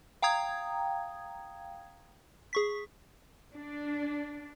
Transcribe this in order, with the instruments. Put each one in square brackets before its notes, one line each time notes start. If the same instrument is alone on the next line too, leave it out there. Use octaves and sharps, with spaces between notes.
[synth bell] F5 G5 A#5 D#6 G#6
G#4 C#6 B6
[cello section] D4